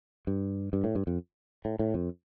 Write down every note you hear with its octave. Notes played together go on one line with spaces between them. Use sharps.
G2
G2
A2
G2
F2
A2
A2
F2